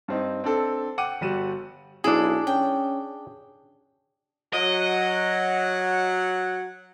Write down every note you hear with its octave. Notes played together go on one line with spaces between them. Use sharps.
G2 C4 D#4
C4 D4 A4
F#5 G5 D6 C#7 D#7
G1 G3 F#4 D#7 E7
B1 D4 E4 G#4
C#4 G5
F#3 D#5 F#5